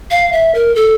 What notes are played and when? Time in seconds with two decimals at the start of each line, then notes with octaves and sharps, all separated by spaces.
0.11 F5
0.33 E5
0.55 A#4
0.75 A4